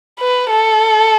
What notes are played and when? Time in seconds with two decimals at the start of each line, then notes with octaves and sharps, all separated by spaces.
0.20 B4
0.50 A4